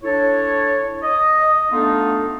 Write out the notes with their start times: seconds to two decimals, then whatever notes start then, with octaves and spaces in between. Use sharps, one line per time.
0.04 D4 E4 A4 C#5
1.03 D#5
1.72 A3 B3 D4 D#4 F4 A4